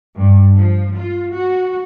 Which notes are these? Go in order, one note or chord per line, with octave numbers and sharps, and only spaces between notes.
G2
F3
F4
F#4